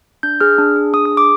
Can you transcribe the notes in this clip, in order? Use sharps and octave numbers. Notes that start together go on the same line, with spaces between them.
D4 G6
G#4 F6
D4
G#4
D4 D#6
D#6
G#4
D6